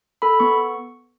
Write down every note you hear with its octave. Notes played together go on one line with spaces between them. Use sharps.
A4 B5
B3 C#6